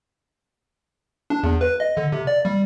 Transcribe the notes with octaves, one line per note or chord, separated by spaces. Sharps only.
D4
E2
B4
D#5
D3
C3
D5
G3